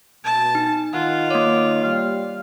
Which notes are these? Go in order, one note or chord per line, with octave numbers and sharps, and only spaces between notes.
B2 A5
D#4
D#3 F4 F#5
A#3 C#5 D6
G3 G4 F5